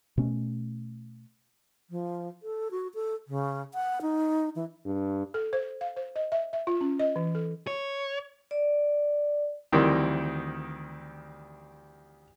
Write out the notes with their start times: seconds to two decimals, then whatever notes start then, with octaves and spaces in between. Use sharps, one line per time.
0.17 B2 A3 C#4
1.90 F3
2.43 A4
2.71 F#4
2.95 A4
3.28 C#3
3.74 F#5
4.02 D#4
4.56 E3
4.86 G2
5.34 A4
5.53 C5
5.81 F5
5.96 C5
6.16 D#5
6.32 E5
6.53 E5
6.67 F4
6.81 C#4
6.99 D#5
7.16 E3
7.35 A4
7.67 C#5
8.51 D5
9.72 D2 D#3 E3 G3 C4